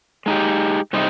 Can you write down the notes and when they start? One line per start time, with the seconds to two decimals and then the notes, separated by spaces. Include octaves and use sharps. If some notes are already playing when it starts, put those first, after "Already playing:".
0.26 G#3 D#4 G4
0.93 C3 G3 C4 D#4 G4